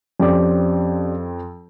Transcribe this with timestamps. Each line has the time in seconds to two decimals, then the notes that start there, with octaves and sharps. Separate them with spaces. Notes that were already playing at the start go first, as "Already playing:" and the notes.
0.20 F2 C4 C#4 G4 D5